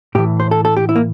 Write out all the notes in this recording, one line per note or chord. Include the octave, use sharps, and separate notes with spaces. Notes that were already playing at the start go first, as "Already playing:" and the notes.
A2 E3 G4
C5
A4
A4
G4
E4
A#3